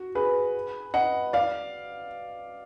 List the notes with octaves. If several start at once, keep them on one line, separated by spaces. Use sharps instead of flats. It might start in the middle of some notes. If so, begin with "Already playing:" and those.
Already playing: F#4
G#4 B4
D#5 F#5
D5 F5